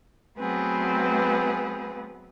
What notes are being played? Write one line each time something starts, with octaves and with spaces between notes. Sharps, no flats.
F#3 A3 B3 C4 G#4 B4